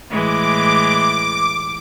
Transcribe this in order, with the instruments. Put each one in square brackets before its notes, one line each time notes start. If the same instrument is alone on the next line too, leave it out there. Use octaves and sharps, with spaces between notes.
[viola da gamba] A2 E3 G#3 [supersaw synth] D6